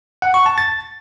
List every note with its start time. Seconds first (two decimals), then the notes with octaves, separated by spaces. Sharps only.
0.22 F#5
0.34 C#6
0.46 A5
0.58 A6